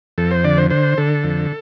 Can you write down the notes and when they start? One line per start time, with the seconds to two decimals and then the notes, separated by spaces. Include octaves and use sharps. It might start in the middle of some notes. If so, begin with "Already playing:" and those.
0.18 F2 A4
0.31 C5
0.44 D3 D5
0.58 C5
0.70 D3 C5
0.97 D3 A4
1.24 F2